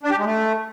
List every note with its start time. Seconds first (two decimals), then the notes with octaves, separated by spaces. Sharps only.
0.03 D4
0.11 G4
0.18 G#3
0.25 A3